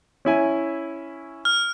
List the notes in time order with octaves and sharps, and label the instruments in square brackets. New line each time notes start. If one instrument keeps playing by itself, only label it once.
[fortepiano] C#4 E4 G#5
[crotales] F6